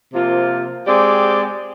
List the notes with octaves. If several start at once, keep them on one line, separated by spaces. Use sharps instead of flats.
C3 F3 A#3 F4
G#3 C4 G4 D5